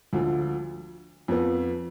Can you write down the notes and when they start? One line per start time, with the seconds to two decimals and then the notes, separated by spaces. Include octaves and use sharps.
0.13 D2 D3 F3
1.28 F2 F3 B3